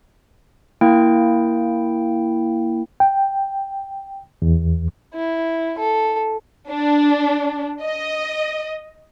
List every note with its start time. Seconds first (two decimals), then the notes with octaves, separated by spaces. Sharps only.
0.81 A#3 E4 G5
3.00 G5
4.42 E2
5.14 E4
5.79 A4
6.70 D4
7.82 D#5